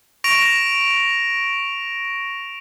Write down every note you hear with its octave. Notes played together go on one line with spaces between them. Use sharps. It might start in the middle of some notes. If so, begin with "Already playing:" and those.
C#6 A#6 D7 F7